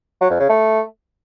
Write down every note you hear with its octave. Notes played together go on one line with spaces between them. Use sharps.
F#3
F2
C#3
A3